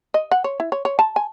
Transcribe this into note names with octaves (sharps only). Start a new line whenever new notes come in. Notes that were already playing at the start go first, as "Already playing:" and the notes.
D#5
F#5
C#5
E4
C#5
C#5
A5
G#5